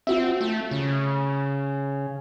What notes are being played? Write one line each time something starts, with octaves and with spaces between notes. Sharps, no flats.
C4 F4 F#4 E5
A3
C#3